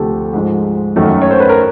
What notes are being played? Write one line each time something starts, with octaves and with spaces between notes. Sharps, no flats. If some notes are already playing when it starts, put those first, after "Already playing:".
Already playing: D2 C3 F3 A3 G4 A4
G#2 F3 G#3
F#2 D#3 F#3 A3
C#5
C5
B4
A#4